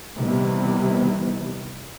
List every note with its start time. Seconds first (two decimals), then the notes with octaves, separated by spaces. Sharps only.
0.15 C3 D#3 E3 G3 B3